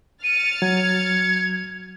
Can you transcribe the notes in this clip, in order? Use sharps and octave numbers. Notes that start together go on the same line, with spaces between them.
F6 A6 C#7 D#7
F#3 G#6